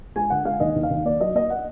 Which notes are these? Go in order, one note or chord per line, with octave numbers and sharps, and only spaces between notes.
G#3 G#5
D3 F#5
G#3 F5
D#2 D#5
D#2
F5
D#2
A#3 D5
F#3 D#5
A#3 D#5
F#5